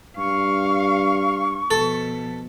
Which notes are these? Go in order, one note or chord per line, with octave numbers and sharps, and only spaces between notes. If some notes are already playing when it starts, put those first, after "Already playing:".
G2 F5 C#6
B2 F3 A4